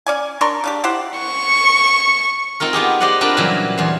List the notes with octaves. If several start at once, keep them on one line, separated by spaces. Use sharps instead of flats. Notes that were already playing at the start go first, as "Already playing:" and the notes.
C#4 D5 G#5
D4 A#4 C6 C#6
C#3 D4 G4
E4 G4 C5 F#5
C#6
C4 D#4 F4 A#4
B3 F4 G4 G#4
G4 C5 D5 D#5 F#5
C4 D4 F4 A#4 B4
A#2 C#3 E3 F#3 G3
E2 C5